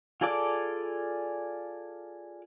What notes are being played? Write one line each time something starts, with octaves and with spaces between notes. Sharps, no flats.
F4 G#4 A4 D5 D6